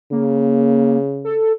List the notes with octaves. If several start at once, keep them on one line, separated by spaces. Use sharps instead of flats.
C#3 A#3
A4